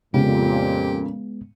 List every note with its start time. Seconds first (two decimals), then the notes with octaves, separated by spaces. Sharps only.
0.14 F2 A#2 C#3 G#3 B3 G4